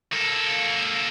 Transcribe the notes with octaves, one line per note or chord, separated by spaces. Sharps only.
A#3 A4